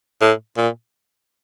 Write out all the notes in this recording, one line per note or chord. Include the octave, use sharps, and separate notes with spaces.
A2
A#2